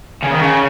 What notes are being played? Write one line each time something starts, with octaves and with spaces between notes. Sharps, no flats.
C#3
D#3
C#3